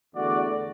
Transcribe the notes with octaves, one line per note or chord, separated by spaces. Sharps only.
E2 D3 A3 F#4 D5